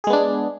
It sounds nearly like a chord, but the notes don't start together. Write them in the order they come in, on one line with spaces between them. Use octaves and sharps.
G#4 G#3 B3 D4